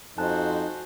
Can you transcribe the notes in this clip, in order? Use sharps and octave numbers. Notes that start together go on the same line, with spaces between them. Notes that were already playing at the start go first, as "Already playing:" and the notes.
F2 D#4 F#4 C5 G#5 A5 F#6